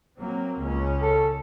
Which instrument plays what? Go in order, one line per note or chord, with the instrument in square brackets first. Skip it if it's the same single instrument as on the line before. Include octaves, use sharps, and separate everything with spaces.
[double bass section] F#3 A#3 C4
C#2 C#4
[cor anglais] A4